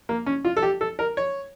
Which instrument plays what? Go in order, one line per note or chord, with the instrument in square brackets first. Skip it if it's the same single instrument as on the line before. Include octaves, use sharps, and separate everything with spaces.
[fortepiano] A#3
C#4
F4
A4
G4
A4
A#4
C#5